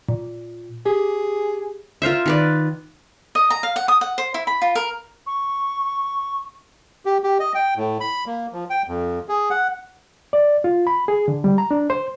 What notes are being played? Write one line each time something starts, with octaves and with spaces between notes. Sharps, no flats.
A#2
G4 G#4
F4 A#4 C5 E5
D#3 B4 D5
D#5
A#5
F5
F#5
D#6
F#5
C5
E4
B5
F4
A#4
C#6
G4
G4
D#5
G5
A2
B5
A#3
F3
G5
F2
G#4
F#5
D5
F4
B5
G#4
D3
G3
A#5
D4
C5